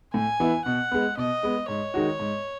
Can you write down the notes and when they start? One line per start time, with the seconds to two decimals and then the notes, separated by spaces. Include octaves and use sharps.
0.14 A2 G#5
0.40 E3 B3 E4
0.65 B2 F#5
0.92 G#3 B3
1.17 B2 D#5
1.43 G#3 B3
1.68 G#2 C#5
1.94 D#3 G#3 D#4 F#4
2.20 G#2